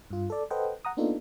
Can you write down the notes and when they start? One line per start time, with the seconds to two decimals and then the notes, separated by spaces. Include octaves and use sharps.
0.11 G2 F4
0.30 A4 D5
0.50 A4 B4 C5 D#5 F#5 G5
0.85 F#5 A#5 D#6
0.97 A#3 B3 D4 D#4 F4 A4